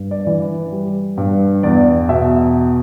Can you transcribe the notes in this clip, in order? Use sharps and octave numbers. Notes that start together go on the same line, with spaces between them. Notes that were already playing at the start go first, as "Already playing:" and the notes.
Already playing: G2
D5
E3
B4
G3
G2
E2 D5
B2 E5